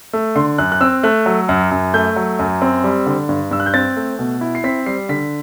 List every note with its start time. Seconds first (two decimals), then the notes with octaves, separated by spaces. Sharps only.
0.13 A3
0.36 D3 C6
0.58 F#2 F#6
0.72 F#6
0.81 C4 E6
1.03 A3 F#6
1.26 F#3
1.49 F#2
1.71 F#2
1.94 A3 G6
2.16 F#3
2.39 F#2
2.62 C4
2.84 G3
3.06 D3
3.29 G2
3.51 G2 E6
3.60 F#6
3.66 G6
3.74 C4 A6
3.96 A3
4.19 B2
4.41 E4
4.55 C7
4.64 C4 B6
4.86 G3 C7
5.09 D3 B6